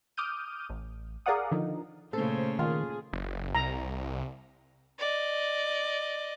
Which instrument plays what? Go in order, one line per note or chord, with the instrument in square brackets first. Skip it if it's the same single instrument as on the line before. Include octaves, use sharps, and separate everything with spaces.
[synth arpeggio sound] D6 D#6 F6 G6 D#7
A1
G#4 A#4 D5 F5 F#5 D#6
D3 D#3 F3 D#4
[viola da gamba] A#2 C#3 [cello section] A3 C#4 C5 [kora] A4
[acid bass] D#3 [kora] F4 [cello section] G#4
[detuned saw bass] F#1
[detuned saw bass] C2 [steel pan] A#5
[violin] D5 D#5